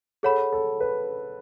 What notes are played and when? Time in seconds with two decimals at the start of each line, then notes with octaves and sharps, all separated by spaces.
0.23 G#4 A4 C#5 F#5 B5
0.53 A4
0.80 B4